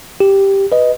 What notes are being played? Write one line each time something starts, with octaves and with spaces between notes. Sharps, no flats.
G4
B4 D#5